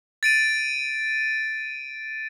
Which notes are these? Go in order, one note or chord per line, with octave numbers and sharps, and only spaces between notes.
A6 D7 D#7